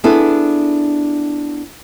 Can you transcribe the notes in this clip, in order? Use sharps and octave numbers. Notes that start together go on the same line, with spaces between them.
B3 D4 E4 G#4 A4